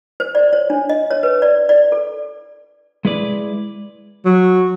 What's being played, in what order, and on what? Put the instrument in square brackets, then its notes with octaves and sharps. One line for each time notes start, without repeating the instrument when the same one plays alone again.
[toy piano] C5
D5
C#5
D4
D#5
C#5
B4
D5
D5
A4
[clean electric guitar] G#3 E4 B4 D5
[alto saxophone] F#3